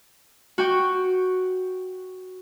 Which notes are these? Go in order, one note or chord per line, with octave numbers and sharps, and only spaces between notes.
F#4 G5 C#6